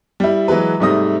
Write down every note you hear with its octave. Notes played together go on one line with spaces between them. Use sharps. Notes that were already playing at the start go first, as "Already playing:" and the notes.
G3 E4
E3 F#3 G#3 B4
G#2 C3 G3 A3 D#6 A#6